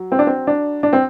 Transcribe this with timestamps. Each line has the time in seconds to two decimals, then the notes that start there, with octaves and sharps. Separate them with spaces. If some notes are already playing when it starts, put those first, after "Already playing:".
Already playing: F#3
0.12 C4
0.19 D4
0.27 C4
0.47 D4
0.83 D4
0.93 C4